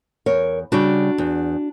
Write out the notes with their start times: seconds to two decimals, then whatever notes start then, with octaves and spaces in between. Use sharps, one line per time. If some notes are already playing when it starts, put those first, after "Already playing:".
0.26 E2 A#4 C#5
0.72 C#3 G3 D4 F#4
1.18 E2